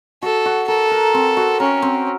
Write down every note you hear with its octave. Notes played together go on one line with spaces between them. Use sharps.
F#4 A4
F#4
A4 A#4
A#4
C4
F#4
C#4 A#4
C4